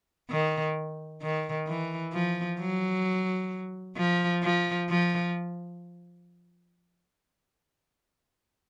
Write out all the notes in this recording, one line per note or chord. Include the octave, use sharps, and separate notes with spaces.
D#3
D#3
E3
F3
F#3
F3
F3
F3